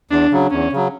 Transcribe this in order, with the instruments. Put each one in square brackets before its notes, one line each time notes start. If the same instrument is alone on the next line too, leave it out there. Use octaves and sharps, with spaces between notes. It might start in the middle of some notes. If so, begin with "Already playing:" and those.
[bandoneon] E2 [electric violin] D4
[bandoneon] C#3 F#3
[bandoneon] E2 [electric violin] C#4
[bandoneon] C#3 F#3